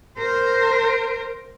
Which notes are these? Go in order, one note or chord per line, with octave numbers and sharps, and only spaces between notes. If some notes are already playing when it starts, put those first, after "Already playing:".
A#4 C5